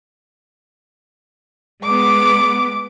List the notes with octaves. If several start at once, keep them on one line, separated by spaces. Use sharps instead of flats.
G#3 B3 D6